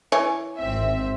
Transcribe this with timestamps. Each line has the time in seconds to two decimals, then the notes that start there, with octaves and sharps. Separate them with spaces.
0.12 E3 C#5 G#5
0.58 G#1 C4 E5